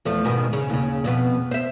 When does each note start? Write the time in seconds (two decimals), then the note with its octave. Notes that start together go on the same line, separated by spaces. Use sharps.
0.05 E2 F3 A3
0.25 G#2 B2 D#3
0.53 C#3
0.70 D#2 C#3
1.04 F2 B2 B3
1.51 C5 E5